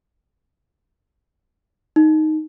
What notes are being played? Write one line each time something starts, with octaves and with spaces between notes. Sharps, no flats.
D#4